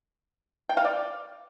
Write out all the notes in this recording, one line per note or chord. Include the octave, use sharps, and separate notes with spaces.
G5
F5
D5